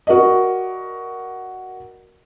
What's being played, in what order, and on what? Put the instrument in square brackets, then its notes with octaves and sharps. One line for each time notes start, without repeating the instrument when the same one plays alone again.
[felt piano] F#4 A#4 D5 D#5